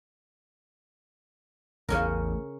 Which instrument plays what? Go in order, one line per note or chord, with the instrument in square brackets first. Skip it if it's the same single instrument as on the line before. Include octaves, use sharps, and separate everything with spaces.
[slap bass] A1 E2 [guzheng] C#3 C#4 A#4